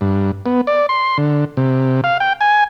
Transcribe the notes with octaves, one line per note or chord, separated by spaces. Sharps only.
G2
B3
D5
C6
D3
C3
F5
G5
G#5